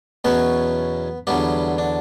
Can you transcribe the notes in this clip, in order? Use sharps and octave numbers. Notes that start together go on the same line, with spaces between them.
E2 B2 F#3 B3 C#4 B4
E2 D3 F#3 G3 B3 G4
D4